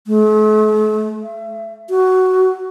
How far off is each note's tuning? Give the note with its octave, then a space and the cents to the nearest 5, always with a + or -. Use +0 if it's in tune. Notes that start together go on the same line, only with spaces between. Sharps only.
A3 -45
E5 +30
F#4 +15